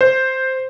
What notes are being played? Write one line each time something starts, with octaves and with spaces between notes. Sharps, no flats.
C5